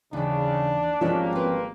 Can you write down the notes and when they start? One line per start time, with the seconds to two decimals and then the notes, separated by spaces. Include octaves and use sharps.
0.13 D#2 C#3 E3 D4
1.01 G#1 F3 G3 A#3 C#4 F#4 D#5 E5
1.33 C4 B4